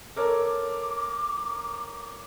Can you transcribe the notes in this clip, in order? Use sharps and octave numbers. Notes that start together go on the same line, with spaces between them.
A4 A#4 C#5 D6